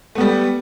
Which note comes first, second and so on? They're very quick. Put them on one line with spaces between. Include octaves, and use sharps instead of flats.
A3 B3 G3